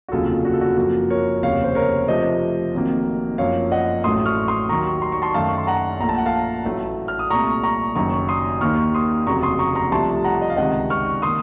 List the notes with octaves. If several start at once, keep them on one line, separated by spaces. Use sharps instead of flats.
F#4
F1 D#2 C#3 F#3 F4 A4
F#4
A4
F#4
F#2 F3 A#3 F#4
A#4 C#5
F1 D#2 C#3 C#5 F5
C5
A#4 C#5
F2 C3 F3 A3 C5 D#5
F1 F2 D#3 F#3 A#3
F#2 F3 A#3 C#5 F5
D#5 F#5
A1 A2 F#3 A3 C6 D#6
C#6 F6
C6 D#6
D#2 D#3 F#3 A#3 A#5 C#6
C6
C#6
A5 C6
F#2 D#3 A3 F5 A5
C#6
C6
F#5 A#5
A#1 A#2 A3 A#5
A5
F#5
F5 A5
A1 A2 F#3 A3
F6
D#6
C2 A#2 A3 A#5 C#6
A#5 C#6
F#1 F#2 D#3 F#3 A#5 C#6
C6 D#6
D#2 D#3 A#3 C#6 F6
C6 D#6
F1 D#2 C#3 F#3 A#5 C#6
C6 D#6
A#5 C#6
A#5 C#6
C2 C3 F3 A3 A5 C6
F#5 A#5
D#5
F5
C#2 C3 D#3 D#5 F#5
C#6 F6
D#3 A#3 C6 D#6